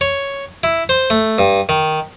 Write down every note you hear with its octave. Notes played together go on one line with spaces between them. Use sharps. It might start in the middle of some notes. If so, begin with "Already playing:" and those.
C#5
E4
C5
A3
G2
D#3